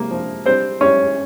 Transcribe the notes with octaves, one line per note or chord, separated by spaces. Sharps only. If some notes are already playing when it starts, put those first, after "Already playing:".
Already playing: C3 A#3
F3
G3 C4 C5
G3 C#4 C#5